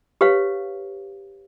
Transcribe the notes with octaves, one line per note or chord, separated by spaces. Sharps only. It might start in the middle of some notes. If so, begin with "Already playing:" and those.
G4 B4 C#5 F5